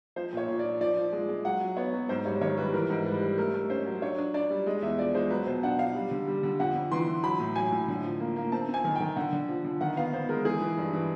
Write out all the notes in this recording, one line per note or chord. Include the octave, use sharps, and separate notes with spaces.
F3 C5
A#2 C#5
A#2
D5
F3
F3 D5
F3
G#3
G#3
F#3 F#5
F#3
B3 C#5
F#3
G#2 C5
G3 C#5
D#3 C#5
G3 B4
E3 A#4
G#2
G3 B4
G3
A3 A#4
A3
C#4 C5
F#3
D4 C#5
D4
D4 D5
G3
G#3 D#5
E2 E5
F3 D5
G#3 C5
F#3 B4
B2 C5
D4 F#5
D4 F5
G3
D3
G3
D3
F2 F#5
F2
E3 C6
E3
F#3 B5
A2
F#3 G#5
A2
D3
F3
A#3
A#3
C4 A5
C4
G#5
D#3
G5
D#3
D3 F#5
D3
F3
D3
D#3 F#5
B3 F5
B3 C5
G#3 A#4
E3 G#4
E3
G2
E3